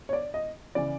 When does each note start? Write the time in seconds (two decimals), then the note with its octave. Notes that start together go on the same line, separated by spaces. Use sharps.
0.09 C#5
0.13 D5
0.34 D#5
0.75 C#3 E3 D5